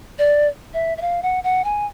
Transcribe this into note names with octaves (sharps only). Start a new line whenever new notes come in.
D5
E5
E5
F5
F#5
F#5
G#5